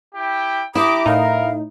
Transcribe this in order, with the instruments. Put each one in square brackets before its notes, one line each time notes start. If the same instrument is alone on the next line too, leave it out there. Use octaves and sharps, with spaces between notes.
[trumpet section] E4 G4 G5
[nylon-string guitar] E4 [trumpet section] G4 A#5 D6 [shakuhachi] D#6
[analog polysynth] A2 D#4 [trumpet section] A#4 [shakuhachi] F5